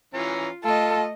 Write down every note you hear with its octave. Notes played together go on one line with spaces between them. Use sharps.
E3 C#4 F4 A#5
A3 F4 A4 D#5